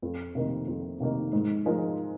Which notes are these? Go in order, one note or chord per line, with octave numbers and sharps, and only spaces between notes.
F2
C3 D#3 A#3 D#4
F2
C3 D#3 A#3 D#4
G#2
F3 G#3 D#4 A#4